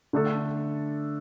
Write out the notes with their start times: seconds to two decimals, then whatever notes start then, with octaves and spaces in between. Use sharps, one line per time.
0.13 D3 A3 D4 A4